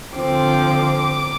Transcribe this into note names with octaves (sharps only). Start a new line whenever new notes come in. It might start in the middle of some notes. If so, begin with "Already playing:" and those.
D3 F3 C4 D6